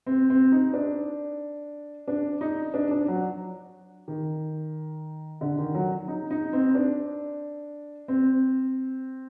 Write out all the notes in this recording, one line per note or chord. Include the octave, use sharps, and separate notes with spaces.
C4
C4
D#4
D4
D4
D#4
D4
D4
F#3
D#3
D3
D#3
F#3
D#4
D#4
C4
D4
C4